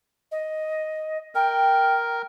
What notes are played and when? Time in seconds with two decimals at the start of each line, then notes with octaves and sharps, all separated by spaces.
0.31 D#5
1.35 A#4 G5